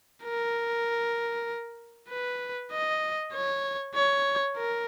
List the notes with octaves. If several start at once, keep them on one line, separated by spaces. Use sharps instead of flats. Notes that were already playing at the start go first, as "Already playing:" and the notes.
A#4
B4
D#5
C#5
C#5
A#4